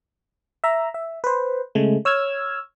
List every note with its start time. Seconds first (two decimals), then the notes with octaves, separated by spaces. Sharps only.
0.64 E5 A#5
0.94 E5
1.24 B4 C5
1.75 C#3 G#3 A3
2.05 C#5 E6 F6 G#6